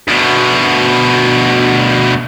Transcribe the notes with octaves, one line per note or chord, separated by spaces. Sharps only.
D2 B2